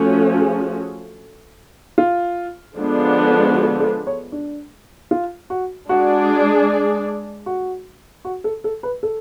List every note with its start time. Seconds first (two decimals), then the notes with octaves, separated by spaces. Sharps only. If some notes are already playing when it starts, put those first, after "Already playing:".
Already playing: F3 A3 C#4 F#4
0.40 G#4
1.98 F4
2.75 D3 F3 G#3 B3 D4
3.54 F#4
3.80 A4
4.07 C#5
4.32 D4
5.11 F4
5.50 F#4
5.89 G#3 D4 F#4 G#4 D5
7.46 F#4
8.25 F#4
8.44 A4
8.64 A4
8.83 B4
9.03 A4